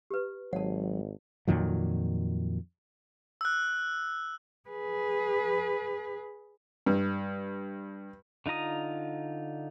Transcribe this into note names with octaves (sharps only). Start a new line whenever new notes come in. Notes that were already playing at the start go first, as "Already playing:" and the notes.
G4 B4
G#1 F#3 F#5 A5
F2 A#2 D#3 F#3
E6 F#6
G#4 B4
G2
D3 D#4 F4 A#5 D#6